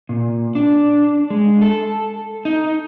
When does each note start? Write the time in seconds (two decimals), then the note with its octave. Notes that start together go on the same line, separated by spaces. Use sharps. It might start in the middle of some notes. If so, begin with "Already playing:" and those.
0.09 A#2
0.55 D4
1.30 G#3
1.61 A4
2.45 D#4